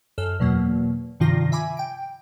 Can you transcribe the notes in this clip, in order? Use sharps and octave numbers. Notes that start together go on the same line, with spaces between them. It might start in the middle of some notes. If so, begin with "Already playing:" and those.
F#2 A4 F6
E2 B2 F#3 A#3
G2 C3 D#3 F3 F4 A#6
E5 G#5 B5 D6
G5 D7